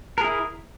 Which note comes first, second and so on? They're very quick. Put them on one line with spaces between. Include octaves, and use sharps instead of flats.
A#4 G#4 E4